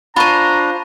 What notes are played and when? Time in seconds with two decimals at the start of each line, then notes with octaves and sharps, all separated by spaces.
0.16 D4 F4 C5 A#5 B5 C#6 D#7